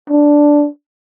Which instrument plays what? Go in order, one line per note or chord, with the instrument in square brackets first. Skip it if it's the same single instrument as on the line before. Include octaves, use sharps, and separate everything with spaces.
[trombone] D4